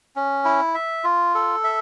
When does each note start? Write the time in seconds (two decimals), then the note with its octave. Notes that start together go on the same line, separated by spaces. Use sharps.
0.16 C#4
0.45 E4
0.74 E5
1.04 F4
1.35 A4
1.64 E5